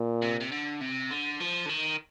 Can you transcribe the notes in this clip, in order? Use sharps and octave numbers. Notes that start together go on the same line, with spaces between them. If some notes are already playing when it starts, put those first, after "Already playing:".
Already playing: A#2
C3
C3
D3
C3
D3
F3
D3
D#3